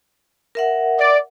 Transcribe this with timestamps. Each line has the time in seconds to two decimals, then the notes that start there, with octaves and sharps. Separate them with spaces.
0.55 A#4 E5 F#5
0.99 D5